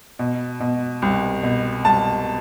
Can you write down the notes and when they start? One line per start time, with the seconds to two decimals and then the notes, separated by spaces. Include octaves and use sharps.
0.19 B2
0.60 B2
1.02 C2
1.43 B2
1.85 C2 A5